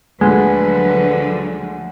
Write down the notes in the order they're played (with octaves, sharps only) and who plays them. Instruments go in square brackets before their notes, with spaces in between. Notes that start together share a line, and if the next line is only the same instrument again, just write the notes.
[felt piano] D2 A#2 [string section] D3 F3 F#3 [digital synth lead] G#3 [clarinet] B4